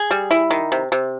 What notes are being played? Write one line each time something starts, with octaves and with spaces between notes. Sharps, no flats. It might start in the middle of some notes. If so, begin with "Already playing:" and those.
Already playing: G#4
G3
E4
D#3
C3
C3